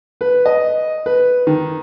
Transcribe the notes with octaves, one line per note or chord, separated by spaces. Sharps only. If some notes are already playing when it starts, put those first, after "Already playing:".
B4
D#5
B4
D#3